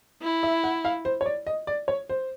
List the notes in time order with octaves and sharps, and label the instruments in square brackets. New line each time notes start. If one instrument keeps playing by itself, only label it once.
[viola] E4
[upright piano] E5
F#5
F5
C5
C#5
D5
D#5
D5
C#5
C5